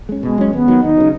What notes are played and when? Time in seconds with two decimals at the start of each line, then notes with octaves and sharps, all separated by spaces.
0.09 G#3 C#4
0.23 B2 G#3
0.38 F#3 C#4
0.53 D#2 B3
0.68 D#3 F#3
0.82 D#2 D#4
0.97 C#3 F#3